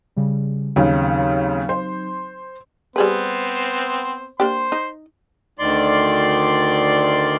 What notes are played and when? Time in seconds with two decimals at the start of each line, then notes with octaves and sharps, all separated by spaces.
0.17 C#3 G3
0.76 D#2 C#3 F#3 C4 D#4
1.69 C5
2.96 G3 B3 C4 G#4 B4 C5
4.40 A#3 D4 G4 C5 C6
4.72 D#4
5.59 D2 D#3 D5 C6